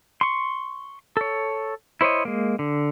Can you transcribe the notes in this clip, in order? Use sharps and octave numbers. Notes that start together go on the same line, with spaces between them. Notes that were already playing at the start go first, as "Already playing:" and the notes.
C6 C#6
A4 C#5
E4 C5 C#5 D#5
G#3 A#3
D3